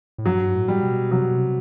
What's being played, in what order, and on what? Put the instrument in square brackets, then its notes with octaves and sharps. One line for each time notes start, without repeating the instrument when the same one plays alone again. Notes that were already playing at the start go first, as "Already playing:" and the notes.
[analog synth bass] A2
[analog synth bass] G2 [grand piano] F#3
[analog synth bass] A2
[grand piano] G3
[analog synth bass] B2
[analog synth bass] C3 [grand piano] F#3
[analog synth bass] B2
C3